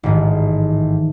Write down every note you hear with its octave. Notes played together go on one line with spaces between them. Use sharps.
A1 G#2 D#3